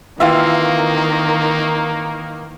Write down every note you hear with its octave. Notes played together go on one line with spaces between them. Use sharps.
D#3 E3 A#3 C4 F4 E5 F5